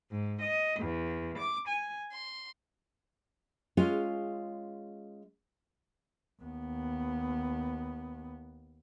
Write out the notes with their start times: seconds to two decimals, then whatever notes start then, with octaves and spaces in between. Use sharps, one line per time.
0.11 G#2
0.40 D#5
0.80 E2
1.37 D6
1.67 G#5
2.12 C6
3.77 G#3 C#4 F4
6.43 D#2 B3